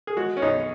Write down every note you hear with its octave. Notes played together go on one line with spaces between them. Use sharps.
G#4
G#3 F#4
C#4
B1 D#4